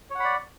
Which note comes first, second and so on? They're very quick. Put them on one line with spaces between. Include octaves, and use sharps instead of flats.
C#5 F#5 B5 D5